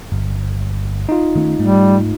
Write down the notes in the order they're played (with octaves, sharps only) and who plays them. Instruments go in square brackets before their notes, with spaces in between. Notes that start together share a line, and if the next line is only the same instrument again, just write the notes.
[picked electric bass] G1
[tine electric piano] D#4 F4
[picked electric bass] D#3 A3 C#4
[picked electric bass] G#2 A3 [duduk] G3